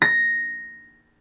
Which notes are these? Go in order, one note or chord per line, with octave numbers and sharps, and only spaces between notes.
A#6